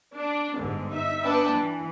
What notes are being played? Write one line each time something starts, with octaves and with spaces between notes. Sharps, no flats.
D4
G1 G#2 D3
D#4 E5
B3 D4 B4 G5 A5
E3